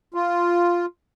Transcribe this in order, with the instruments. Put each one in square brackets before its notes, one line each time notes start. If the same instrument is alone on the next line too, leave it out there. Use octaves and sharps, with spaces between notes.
[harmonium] F4